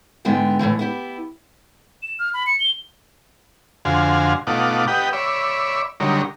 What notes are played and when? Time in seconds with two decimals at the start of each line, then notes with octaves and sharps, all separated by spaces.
0.25 G#2 D3 G#3 B3 G5
0.59 A2 D3 E3 F3
0.79 B3 E4 G4
2.02 E7
2.19 F6
2.34 B5
2.46 C#7
2.60 G7
3.85 F2 D3 F#4 C5 F5 G#5
4.47 B2 A3 D#4 F4 F#5 D6
4.88 G4 B4 D#5 F#5 G5
5.13 C#5 D5 E5 B5
6.00 D3 F#3 G3 D#4 A#4 C#5